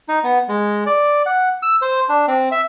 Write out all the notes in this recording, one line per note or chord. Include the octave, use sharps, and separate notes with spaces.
D#4
B3
G#3
D5
F#5
E6
C5
D4
C4
E5